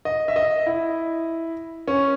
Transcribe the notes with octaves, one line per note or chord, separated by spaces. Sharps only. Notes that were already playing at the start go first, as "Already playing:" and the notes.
D#5
E5
D#5
E4
C#4